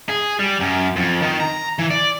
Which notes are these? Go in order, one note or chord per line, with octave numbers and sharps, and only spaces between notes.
G#4
G3
F#2
F2
D#3
A#5
E3
D5